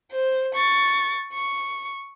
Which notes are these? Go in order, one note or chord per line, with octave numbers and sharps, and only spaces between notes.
C5
C#6 A6
C#6